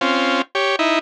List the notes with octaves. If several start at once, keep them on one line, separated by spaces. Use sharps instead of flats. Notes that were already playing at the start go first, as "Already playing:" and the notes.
C4 C#4 F4
G4 C#5
D#4 E4